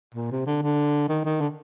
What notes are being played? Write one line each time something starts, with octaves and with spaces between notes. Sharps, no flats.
A#2
C3
D3
D3
D#3
D#3
D3